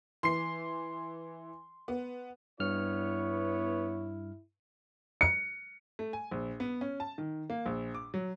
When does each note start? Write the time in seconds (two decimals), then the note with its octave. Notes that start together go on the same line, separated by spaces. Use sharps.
0.23 E3 C6 C7
1.88 B3
2.60 G2 B3 E4 C#5 F6
5.21 C#7
5.99 A3
6.13 G#5
6.31 A#1
6.60 B3
6.81 C#4
7.00 A5
7.18 D#3
7.50 A#3
7.66 A#1
7.95 D6
8.14 F#3